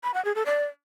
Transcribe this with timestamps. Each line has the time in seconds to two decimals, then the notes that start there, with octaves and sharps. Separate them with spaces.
0.03 B5
0.14 F#5
0.25 G#4
0.35 A4
0.46 D5